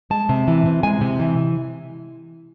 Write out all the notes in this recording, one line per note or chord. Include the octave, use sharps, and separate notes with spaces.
G#3 A5
C3
E3
C3
G#3 G#5
C3
E3